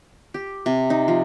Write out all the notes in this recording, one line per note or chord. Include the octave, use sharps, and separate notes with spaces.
G4
C3
D#4
F3